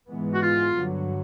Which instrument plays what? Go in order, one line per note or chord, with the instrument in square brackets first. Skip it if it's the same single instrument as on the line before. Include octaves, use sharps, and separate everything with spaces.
[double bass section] G#2 E3 G#3 B3
[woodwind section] F#4
F4
[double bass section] G2 D3 F#3